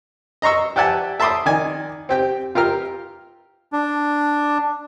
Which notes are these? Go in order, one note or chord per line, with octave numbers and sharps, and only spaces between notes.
D#5 A#5 C6 C#6 E6
G4 D5 E5 F#5 G#5 A5
E5 A5 B5 C6 D6 D#6
D#3 D5 G#5
C4 G4 G5
F4 G4 A#4 F6
D4